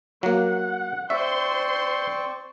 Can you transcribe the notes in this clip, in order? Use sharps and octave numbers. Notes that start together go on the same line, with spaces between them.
F#3 A#3 F#5
C4 C5 D5 E5 C6 C#6